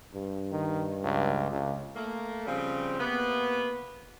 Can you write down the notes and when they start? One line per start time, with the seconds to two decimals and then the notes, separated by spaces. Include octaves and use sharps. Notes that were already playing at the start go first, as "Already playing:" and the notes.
0.14 G2
0.52 D#3
1.03 C#2
1.51 C#2
1.96 A3 A#3
2.47 C#3 F3 G3 C4
2.99 C3 A#3 B3